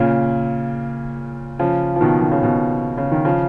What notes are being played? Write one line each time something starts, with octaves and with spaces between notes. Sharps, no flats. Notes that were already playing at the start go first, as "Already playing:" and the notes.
Already playing: A#2 C#3
C#3 F3
F3
B2 D#3
D#3
C#3
B2
C#3
D#3
C#3 F3